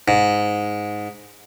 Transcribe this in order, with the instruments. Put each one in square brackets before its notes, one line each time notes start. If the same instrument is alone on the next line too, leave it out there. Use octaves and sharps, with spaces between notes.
[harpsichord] G#2